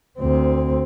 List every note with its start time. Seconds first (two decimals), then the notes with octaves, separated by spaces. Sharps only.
0.19 D2 C4